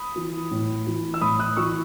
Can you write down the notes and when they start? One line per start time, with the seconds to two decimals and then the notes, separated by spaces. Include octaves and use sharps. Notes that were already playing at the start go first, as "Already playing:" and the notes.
Already playing: B5 D#6
0.16 E3
0.51 A2
0.87 E3
1.14 E6
1.21 A2 B5 D#6
1.39 D#6 F#6
1.57 E3 C#6 E6